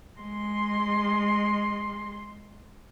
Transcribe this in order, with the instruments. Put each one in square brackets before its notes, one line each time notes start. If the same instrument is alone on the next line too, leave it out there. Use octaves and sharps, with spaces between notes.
[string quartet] G#3 C6